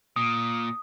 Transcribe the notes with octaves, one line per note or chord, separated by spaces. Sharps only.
A#2 D#6